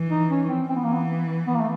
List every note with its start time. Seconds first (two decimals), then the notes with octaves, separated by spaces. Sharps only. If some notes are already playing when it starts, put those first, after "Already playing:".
Already playing: E3
0.10 D#4
0.30 C#4
0.49 C4
0.69 E3 C4
0.76 B3
0.84 A#3
0.92 B3
1.47 B3
1.54 A#3
1.61 A3